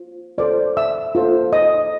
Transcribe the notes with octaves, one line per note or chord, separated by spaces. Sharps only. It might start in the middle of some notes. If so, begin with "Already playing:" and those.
Already playing: F4 C5
F4 A4 C5 D5 D6
E5 E6
F4 A4 C5
D#5 D#6